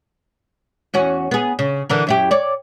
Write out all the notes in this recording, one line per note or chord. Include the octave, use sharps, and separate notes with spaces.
E2 C#4 F#4
B3 G#4
C#3
D3 E3 A#4
F#2 E4 G4
C#5 D5